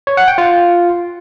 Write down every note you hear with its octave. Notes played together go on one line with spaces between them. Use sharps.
C#5
F#5
G5
F4